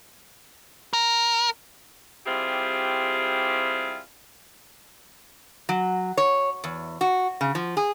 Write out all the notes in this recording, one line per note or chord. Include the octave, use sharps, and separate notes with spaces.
A#4
G3 C4 E4 F4 G4 G#4
F#3
C#5
E2
F#4
C#3
F3
G#4